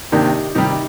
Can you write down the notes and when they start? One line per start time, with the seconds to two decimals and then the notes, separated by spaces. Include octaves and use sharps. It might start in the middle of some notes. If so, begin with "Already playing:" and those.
0.12 C3 D#3 A#3 D4 D#4 G4
0.55 C3 D#3 G3 D#4 G4